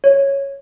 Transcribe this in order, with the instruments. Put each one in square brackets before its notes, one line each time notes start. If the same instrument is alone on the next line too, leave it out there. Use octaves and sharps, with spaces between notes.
[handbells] C#5